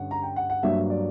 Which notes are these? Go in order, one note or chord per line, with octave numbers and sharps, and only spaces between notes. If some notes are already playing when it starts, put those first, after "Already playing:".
Already playing: G2 D3 C#4 F#5
A#5
G5
F#5
F#5
G2 F#3 A#3 D4 E5
D5